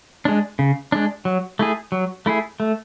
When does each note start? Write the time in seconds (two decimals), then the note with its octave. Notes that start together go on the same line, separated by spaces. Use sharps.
0.25 G#3 D4
0.59 C#3
0.92 G#3 D4
1.25 F#3
1.59 A3 E4 G#4
1.92 F#3
2.26 A3 E4 G#4
2.60 A3